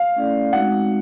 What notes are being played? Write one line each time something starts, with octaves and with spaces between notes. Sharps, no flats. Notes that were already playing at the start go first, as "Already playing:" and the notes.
Already playing: F5
A3 C#4 E4 A4 D5
G#3 C4 D#4 F#4 F#5